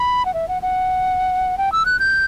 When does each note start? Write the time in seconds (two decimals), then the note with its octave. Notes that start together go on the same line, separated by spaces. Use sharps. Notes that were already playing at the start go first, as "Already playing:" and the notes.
Already playing: B5
0.26 F#5
0.34 E5
0.48 F#5
0.62 F#5
1.58 G5
1.72 E6
1.86 F#6
2.00 G6